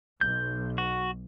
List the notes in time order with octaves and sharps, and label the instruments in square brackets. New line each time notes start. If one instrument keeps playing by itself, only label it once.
[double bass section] B1 [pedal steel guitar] G6
[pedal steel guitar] F#4